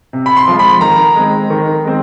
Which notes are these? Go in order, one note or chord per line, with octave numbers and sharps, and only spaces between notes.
C3
B5
C6
F3 G#3
B5
D#3 A#5
G#3 C4
D#3
G#3 C4